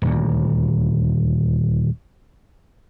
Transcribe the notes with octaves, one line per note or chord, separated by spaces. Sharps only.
D#1 D2